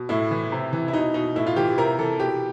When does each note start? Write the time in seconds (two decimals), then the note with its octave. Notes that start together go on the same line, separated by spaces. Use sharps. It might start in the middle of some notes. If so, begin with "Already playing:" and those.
Already playing: B2
0.09 A2 E4
0.31 E3
0.52 C3
0.73 E3
0.88 E4
0.93 B2 D#4
1.14 B2 D#4
1.36 A2 E4
1.47 F4
1.56 E3 G4
1.78 C3 A#4
1.99 E3 A4
2.19 B2 G4